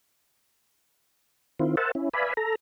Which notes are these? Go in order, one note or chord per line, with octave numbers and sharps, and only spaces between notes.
D#3 C4 E4 F4
A#4 C5 E5 F#5 A5
C#4 E4
B4 D5 E5 F5 G#5 B5
A4 A#5